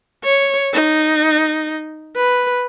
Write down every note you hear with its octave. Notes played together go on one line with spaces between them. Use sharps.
C#5
D#4
B4